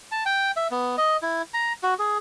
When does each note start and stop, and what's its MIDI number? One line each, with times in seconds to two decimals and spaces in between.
0.12 0.24 81
0.26 0.51 79
0.57 0.68 76
0.71 0.96 59
0.98 1.17 75
1.22 1.42 64
1.54 1.73 82
1.83 1.94 66
1.99 2.18 68